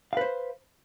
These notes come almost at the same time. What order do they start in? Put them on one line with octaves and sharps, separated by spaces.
F5 B4 C5